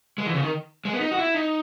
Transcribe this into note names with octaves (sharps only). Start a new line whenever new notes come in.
G#3
E3
C#3
D#3
G#3
B3
D#4
F#4
E4
D#4